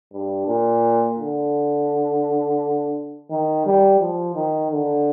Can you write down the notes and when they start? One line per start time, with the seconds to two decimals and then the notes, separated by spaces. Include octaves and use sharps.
0.13 G2
0.47 A#2
1.19 D3
3.30 D#3
3.66 G3
4.00 F3
4.35 D#3
4.72 D3